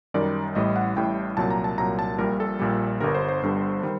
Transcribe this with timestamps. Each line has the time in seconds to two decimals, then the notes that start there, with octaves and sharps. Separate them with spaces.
0.14 F#2 D#3 G3 D5
0.55 A1 A2 G3 D#5
0.76 F#5
0.96 A1 A2 G3 G5
1.37 C2 A#2 F#3 A5
1.50 A#5
1.64 A5
1.77 C2 A#2 F#3 A#5
1.99 A5
2.18 A#1 A#2 G3 A#4
2.40 A4
2.59 A#1 A#2 G3
3.01 G1 G2 D3 G3 A#4
3.15 C5
3.28 C5
3.42 G1 G2 D3 G3
3.83 D#3 G3